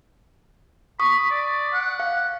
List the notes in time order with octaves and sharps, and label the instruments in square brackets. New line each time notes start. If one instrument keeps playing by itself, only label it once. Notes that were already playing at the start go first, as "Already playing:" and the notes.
[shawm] B5 [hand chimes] C#6 D#6
[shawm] D5
F#5
[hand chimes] F5